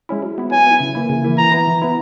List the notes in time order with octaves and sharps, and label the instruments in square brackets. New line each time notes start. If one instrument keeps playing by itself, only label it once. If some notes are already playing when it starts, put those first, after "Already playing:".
[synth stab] G#3 C#4 E4
F#3
B3 E4
[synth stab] F#3 [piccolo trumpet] G#5
[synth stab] B3 E4
C#3
E3 A#3 E4
C#3
E3 A#3 E4
[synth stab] E3 [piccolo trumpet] A#5
[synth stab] B3 E4
E3
B3 E4